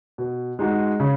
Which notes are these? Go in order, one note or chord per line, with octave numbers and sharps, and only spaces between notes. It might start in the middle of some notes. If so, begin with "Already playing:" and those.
B2
G#3 D#4 F#4
C#3